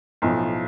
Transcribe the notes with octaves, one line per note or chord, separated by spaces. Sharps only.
B1 A2 F3